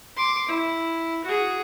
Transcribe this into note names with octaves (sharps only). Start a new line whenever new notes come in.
C6 D6
E4
F#4 G#4